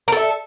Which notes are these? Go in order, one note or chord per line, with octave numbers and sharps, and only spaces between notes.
A4 A#4 E5